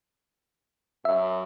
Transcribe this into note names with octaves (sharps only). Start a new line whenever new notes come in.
F#2 E5